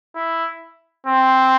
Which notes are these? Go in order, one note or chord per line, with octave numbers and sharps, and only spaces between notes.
E4
C4